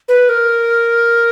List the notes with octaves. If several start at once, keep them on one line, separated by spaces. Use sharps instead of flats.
B4
A#4